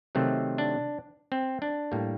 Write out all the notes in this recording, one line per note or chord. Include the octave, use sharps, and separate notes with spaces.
C3 D#3 F#3 A3 C4
D4
C4
D4
A2 G3 A#3